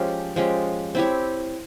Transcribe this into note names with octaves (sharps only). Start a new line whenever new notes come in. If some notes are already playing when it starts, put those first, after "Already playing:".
Already playing: F3 G#3 C#4 G4
F3 G#3 C#4 G4
C4 E4 G4 C#5